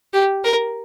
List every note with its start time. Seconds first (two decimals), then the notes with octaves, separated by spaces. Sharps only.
0.13 G4
0.45 A#4